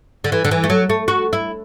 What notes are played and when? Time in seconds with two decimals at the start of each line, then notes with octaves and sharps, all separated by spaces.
0.24 D3
0.32 E3
0.45 D3
0.51 E3
0.64 A3
0.70 F#3
0.90 A3
1.08 F#4
1.33 E4